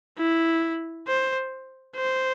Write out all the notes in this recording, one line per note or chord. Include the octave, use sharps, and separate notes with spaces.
E4
C5
C5